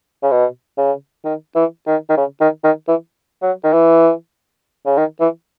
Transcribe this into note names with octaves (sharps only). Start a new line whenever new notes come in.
C#3
B2
C#3
D#3
E3
D#3
D#3
C#3
D#3
D#3
E3
F#3
D#3
E3
C#3
D#3
E3